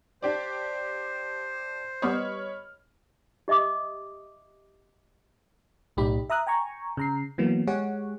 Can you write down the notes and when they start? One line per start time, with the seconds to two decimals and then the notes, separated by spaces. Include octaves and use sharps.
0.22 D4 G4 C5 D5
2.02 G3 B3 C#5 D#5 B5 F6
3.48 G4 D#5 E5 D6 D#6
5.97 B1 A2 D#4 G4 B5
6.30 E5 A#5 D#6 F#6
6.47 G5 G#5 A#5 C#6
6.97 C#3 A#5 C7
7.38 E3 F#3 A#3 B3
7.67 G#3 G4 G#4 C#5 F#5